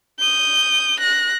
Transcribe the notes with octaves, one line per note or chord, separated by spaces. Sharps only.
D#6 G6
F#6 A#6